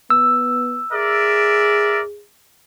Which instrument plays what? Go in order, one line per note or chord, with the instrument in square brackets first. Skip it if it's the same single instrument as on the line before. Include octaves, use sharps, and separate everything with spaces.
[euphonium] B3 [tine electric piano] E6
[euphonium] G#4 [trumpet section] A#4 D5 E5